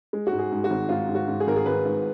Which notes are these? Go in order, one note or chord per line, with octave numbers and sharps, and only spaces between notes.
G#3
F#4
G#2
G#4
G#2
F#4
G#1
G#2 F4
G#2
F#4
G#2
G#4
G#1 A#4
G#4
G#1 B4
G#2